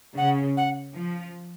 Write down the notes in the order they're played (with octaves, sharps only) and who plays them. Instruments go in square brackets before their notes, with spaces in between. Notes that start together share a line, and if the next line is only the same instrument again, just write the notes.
[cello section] C#3 [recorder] F#5
[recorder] F#5
[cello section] F3